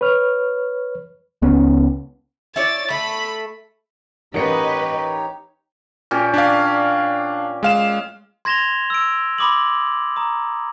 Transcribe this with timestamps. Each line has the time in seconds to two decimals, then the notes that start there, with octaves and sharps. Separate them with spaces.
0.01 B4 C#5 F6
1.42 C#2 B3 C#4
2.56 E4 C#5 D5 A6
2.90 A3 B5
4.34 A1 A#3 D#4 G4 B4 C#5 D#5 C#7
6.11 A#2 C#4 G4
6.34 D4 F5
7.63 G#3 F5 E7
8.45 C6 G#6 A#6 E7 F7 G7
8.90 E6 D7
9.38 B5 C6 D6 D#6 F#7
10.16 A#5 D#6